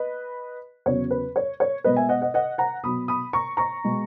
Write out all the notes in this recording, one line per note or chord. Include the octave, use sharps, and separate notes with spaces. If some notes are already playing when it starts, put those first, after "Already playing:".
Already playing: B4 D#5
E2 C#3 F#3 B3 C#5
B4
C#5
C#5
B2 G#3 B3 B4 D#5
E5 G#5
D#5 F#5
D#5 F#5
D#5 F#5
F#5 A#5
B2 F#3 B3 B5 D#6
B5 D#6
A#5 C#6
A#5 C#6
B2 G#3 B3